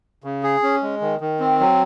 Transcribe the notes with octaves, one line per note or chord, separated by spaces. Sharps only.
C#3
G#4
C#4
G#3
D#3
D#3
C4
F#3